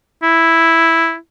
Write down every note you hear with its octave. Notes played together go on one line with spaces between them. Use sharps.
E4